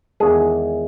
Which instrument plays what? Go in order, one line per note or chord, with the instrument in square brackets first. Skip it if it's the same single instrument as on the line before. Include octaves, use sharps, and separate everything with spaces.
[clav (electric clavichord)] E2 D#3 G#3 G#4